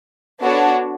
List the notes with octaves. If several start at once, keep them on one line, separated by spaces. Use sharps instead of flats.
B3 D4 F#4 A4 C#5